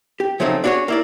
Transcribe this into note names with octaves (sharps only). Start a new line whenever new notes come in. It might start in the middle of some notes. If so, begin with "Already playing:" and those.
G4
C#3 F3 F#3 A3 C4 D#4
D4 E4 F#4 G#4 C#5
A#3 E4 D5